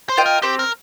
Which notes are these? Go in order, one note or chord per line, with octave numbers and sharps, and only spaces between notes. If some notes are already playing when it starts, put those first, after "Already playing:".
C5
F4 D#5 G5
A#4
C4 G4
A#4